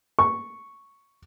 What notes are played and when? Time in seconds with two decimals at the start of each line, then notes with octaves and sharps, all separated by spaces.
0.19 C#6